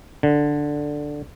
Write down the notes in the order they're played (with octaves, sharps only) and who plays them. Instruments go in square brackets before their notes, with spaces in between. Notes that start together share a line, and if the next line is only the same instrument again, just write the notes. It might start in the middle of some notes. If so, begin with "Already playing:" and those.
[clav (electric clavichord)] D3